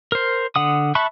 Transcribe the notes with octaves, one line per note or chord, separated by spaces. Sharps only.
A#4 C5
D3 F#5 D#6
E5 A5 B5 C#6 F#6